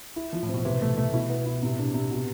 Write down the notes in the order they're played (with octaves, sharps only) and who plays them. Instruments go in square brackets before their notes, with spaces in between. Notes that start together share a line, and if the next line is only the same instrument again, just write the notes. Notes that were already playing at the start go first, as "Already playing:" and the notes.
[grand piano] E4
F3
[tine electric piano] A2
[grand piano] C4
[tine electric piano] B2
[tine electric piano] C3 [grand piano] E3
[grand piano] A3
A3
[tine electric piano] B2 [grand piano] E4
[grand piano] B3
E4
[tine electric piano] A2 [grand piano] C3
[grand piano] D4
C3
B2